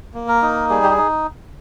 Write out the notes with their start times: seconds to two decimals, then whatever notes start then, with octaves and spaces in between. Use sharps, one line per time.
0.14 A#3
0.28 A#4
0.42 D#4
0.70 G3 G#4
0.83 G4
0.90 G#4
0.97 D#4